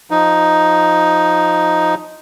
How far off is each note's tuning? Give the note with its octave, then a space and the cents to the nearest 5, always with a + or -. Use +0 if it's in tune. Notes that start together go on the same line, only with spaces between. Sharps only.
F3 +5 D#4 +5